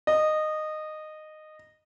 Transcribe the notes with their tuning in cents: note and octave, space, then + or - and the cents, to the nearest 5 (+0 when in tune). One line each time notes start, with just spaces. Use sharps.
D#5 -15